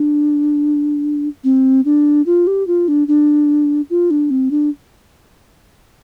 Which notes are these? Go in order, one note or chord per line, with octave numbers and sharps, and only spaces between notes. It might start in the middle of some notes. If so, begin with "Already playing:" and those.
Already playing: D4
C4
D4
F4
G4
F4
D4
D4
F4
D4
C4
D4